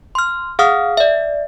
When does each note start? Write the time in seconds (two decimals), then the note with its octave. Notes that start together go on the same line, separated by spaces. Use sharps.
0.15 C6 F6
0.59 G#4 F5 F#5 D#6 F6
0.97 D5 E5